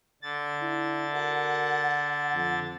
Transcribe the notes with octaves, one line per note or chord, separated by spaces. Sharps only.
D3 A6
E4
F#4 A#4 F#5
F2